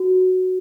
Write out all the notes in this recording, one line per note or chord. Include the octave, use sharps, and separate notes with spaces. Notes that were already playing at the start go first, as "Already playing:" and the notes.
Already playing: F#4